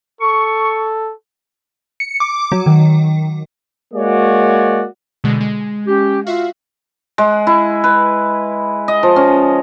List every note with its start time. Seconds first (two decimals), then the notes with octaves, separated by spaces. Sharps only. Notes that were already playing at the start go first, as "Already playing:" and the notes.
0.21 A4 C#6
2.00 C#7
2.20 D6
2.52 F#3
2.66 D#3
3.94 G#3 A#3 F#4 C#5 D5
5.24 B2 D3 G#3
5.40 G#3
5.86 C#4 G4
6.27 F4 F#4 E5 F5
7.18 G#3
7.47 E4
7.84 B4
8.88 D#5
9.03 F3
9.16 C#4